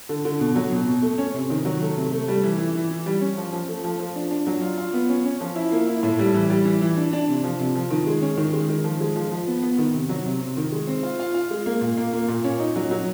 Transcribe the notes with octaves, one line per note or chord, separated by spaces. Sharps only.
D3
D3
B2
F#3
B2
B2
A3
C#4
C3
D#3
F#3
A3
C3
A3
G3
E3
E3
E3
E3
G3
C#4
F3
F3
A3
F3
F3
D4
D4
F#3
F4
F4
B3
C#4
C#4
F3
E4
A#3
E4
A2
G3
E3
G3
E3
E3
D4
D4
C3
F3
C3
F3
D#3
G#3
C#4
D#3
G#3
D#3
F3
G#3
F3
F3
B3
B3
D#3
C3
F#3
C3
C3
D#3
G#3
C4
F4
F4
F4
G#3
A#3
A#2
A#3
A#3
A#2
C#4
D#4
F#3
F#3